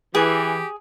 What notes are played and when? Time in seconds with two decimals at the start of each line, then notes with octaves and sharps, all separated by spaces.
0.15 E3 G4 G#4